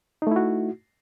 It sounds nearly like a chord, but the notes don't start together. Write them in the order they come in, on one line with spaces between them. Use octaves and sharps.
D#4 A3 E4 F#4